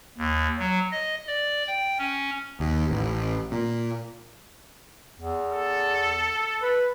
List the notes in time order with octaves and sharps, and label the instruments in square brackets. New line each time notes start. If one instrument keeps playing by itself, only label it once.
[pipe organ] D#2
F#3
D#5
D5
G5
C#4
[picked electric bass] D#2
A1
A#2
[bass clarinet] E2
[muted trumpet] A4
[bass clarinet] B4